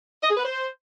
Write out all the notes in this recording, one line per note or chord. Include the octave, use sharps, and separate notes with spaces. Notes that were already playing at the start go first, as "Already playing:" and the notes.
D#5
G#4
B4
C5